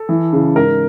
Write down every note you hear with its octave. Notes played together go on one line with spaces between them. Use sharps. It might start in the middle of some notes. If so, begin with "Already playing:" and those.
Already playing: A4
E3
C#3
G#2 A#4